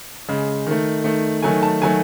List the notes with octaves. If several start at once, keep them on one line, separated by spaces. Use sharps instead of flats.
C#3 G#3
D#3 A3
D#3 A3
D#3 F#3 A3 G#5
A5
D#3 F#3 A3 G#5